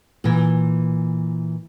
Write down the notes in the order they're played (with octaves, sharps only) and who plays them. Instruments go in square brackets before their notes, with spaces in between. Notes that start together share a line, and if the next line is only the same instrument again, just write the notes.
[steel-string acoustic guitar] A#2 E3